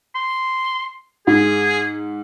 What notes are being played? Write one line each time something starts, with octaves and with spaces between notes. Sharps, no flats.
C6
G#2 G#4